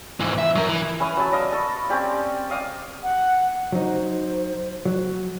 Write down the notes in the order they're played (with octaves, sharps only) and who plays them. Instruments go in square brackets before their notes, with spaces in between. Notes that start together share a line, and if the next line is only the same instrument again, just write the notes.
[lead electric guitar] G#2 E3
E5
F#2 A#4
E3
[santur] C#4 B4 E5 D#6
F#3 B4 A5 E6
D5 D#5 F5
A4 C#6
C4 C#4 G4 D5
D#5 F5 D6 D#6
[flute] F#5
[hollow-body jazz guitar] F#3 D#4 [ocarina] C5
[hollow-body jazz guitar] F#3